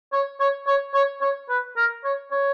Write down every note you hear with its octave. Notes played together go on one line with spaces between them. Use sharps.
C#5
C#5
C#5
C#5
C#5
B4
A#4
C#5
C#5